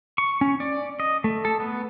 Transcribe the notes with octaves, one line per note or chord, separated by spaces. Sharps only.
C#6
C#4
D5
D#5
A3
A4
B3